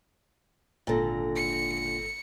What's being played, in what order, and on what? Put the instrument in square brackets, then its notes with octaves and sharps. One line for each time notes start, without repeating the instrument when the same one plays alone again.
[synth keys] G#1 A4 A#6 [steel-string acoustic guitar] A#2 D3
[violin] C#7